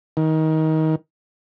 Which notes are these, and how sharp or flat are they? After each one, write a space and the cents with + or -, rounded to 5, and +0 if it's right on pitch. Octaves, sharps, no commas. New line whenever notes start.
D#3 +25